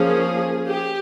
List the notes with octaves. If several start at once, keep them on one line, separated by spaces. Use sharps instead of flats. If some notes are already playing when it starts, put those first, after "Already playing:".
Already playing: F3 A#3 C#4 G#4
G4